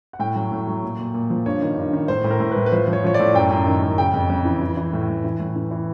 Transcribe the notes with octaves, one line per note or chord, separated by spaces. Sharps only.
F#5
A2 G5
F#3
A2
F#3
A#2
A#2
A#2
F3
G2 C#5
D#3
G2
D#3
A2 C5
A2
A#4
A2
A2 B4
B4
F3 C5
F3
C#5
F3 C#5
D5
A2
F#2 G5
F#2
D#3
F#2
C#3 G5
F2
F2
E3
E3
E3
A2
A2
E3
A2
E3
E3